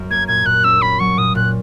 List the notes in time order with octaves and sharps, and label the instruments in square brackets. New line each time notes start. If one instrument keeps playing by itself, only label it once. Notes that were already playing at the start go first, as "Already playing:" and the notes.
Already playing: [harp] F#2
[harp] A#3 [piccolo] G#6
[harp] A#2 [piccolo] G#6
[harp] A#2 [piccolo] F#6
[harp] C#4 [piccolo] E6
[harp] C#4 [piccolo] B5
[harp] F#3 [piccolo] C#6
[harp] A#2 [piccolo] D#6
[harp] A#2 [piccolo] F#6